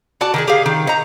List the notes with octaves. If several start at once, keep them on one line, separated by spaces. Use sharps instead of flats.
F#4 D5 A5
D#3 G4 G#4
G4 G#4 F5
D#3
D#4 A#5